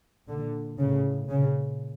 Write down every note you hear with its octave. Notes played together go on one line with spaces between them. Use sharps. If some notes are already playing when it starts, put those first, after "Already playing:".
A#2 D3
A2 C#3
A#2 C#3